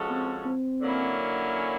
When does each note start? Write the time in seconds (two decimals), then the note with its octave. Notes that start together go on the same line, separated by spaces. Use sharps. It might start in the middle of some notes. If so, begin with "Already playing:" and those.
Already playing: F3 G#3 C#4 F#4 A4
0.10 C4
0.45 C4
0.81 D3 F#3 A#3 C#4 E4